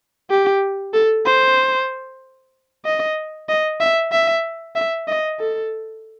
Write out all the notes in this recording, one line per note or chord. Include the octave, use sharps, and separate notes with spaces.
G4
A4
C5
D#5
D#5
E5
E5
E5
D#5
A4